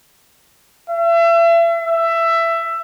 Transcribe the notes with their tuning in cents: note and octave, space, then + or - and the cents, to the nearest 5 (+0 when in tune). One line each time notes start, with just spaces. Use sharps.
E5 +35
E5 +15